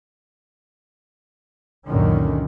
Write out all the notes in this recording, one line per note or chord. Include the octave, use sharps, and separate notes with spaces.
C#2 F#2 A#2 D3 D#3 C#4